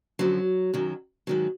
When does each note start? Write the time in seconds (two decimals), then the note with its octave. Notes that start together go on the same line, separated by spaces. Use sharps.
0.19 F#2 D3 F3 F#3
0.74 F#2 D#3 F#3
1.27 G#2 D#3 F#3